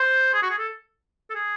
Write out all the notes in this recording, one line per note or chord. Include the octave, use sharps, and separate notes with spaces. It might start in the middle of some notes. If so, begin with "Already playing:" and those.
Already playing: C5
G#4
F#4
G#4
A4
A4
G#4